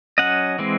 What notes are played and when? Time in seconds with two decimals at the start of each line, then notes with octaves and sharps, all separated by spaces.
0.18 F#3 C#4 D#5 F#5
0.59 E3 G#3 C4